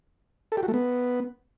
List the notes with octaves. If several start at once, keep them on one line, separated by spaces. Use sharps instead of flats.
A4
G4
F#4
A3
B3